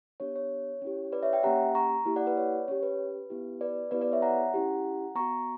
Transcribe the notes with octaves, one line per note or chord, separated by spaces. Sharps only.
B3 D4 G4 C#5
C#5
C#4 E4 G4
B4 D5
C#5 E5
E5 G5
A#3 C#4 G4 F#5 A#5
A#5 C#6
A#3 E4 G4
D5 F#5
B4 D5
C#5
C#4 G4 C#5
B4
B3 E4 G4
B4 D5
B3 E4 G4 B4 D5
B4 D5
C#5 E5
F#5 A#5
C#4 E4 G4
B3 F#4 A#5 C#6